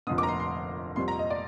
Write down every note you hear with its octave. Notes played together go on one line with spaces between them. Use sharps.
F1 F2 D3 D#6
D6
A#5
C6
C6
F2 C3 G3 C6
A#5
D#5
D5